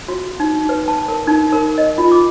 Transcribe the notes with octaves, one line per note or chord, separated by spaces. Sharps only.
F#4
D#4
B4
A5
A#4
D#4
A#4
D#5
F4
D6